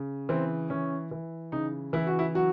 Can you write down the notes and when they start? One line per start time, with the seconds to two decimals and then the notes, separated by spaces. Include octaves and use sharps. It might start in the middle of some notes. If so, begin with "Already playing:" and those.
Already playing: C#3
0.29 E3 C4
0.70 E3 C#4
1.11 E3
1.52 C#3 D#4
1.93 E3 E4
2.07 F#4
2.19 E4
2.35 F#3 F#4